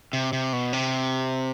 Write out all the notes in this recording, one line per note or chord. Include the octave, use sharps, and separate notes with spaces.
C3
C3
B2
C3